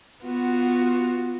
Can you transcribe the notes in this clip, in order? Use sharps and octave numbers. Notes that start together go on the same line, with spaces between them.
B3 F4 F#4